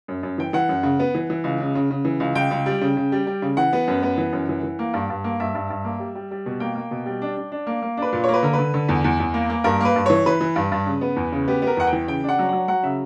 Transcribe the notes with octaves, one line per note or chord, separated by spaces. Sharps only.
F#2
F#2
E3 G5
E3 F#5
F#2
C#3
B3
E3
E3
C#2
C#3
C#3
C#3
E3
C#2
C#2 G5
C#2
G3
C#3
C#3
G3
G3
C#3
E3 F#5
B3
F#2
B3
E3
F#2
E3
E3
A#3
G2
G2
A#3
G2 E5
G2
G2
A#3
G3
G3
G3
B2
A#3 G5
A#3
B2
G3
D4
D4
D4
A#3
A#3
D4 B4
A#2
A#3 C#5
B4
D3 A#4
B4
D3
D3
E2
E2
E2
A#3
A#3
G2 A#4
A#3 B4
G2
E3 C#5
E3 B4
E3
G2
G2
C#3
B3
E2
C#3
B3 G4
B3 A#4
E2 F#5
G5
E3
C#3 G5
D4 F#5
F#3
F#3 F#5
F#3 F#5
C#3 E5